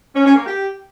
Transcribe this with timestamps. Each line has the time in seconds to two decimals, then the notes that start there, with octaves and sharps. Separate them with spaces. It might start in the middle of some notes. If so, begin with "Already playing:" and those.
0.15 C#4
0.25 C#4
0.36 A#3
0.46 G4